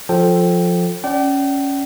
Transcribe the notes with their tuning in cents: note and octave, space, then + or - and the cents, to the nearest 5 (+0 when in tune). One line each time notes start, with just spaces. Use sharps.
F3 +15 A4 +0 G5 +0
C#4 +0 D5 +0 G5 -40